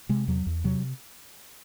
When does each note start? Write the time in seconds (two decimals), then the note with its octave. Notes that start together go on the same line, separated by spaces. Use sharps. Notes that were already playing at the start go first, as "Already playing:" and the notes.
0.09 C3 G#3
0.28 E2 F#3
0.46 E2
0.64 C3 F#3